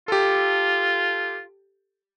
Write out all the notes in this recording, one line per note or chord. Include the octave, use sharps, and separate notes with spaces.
F4 G4 A4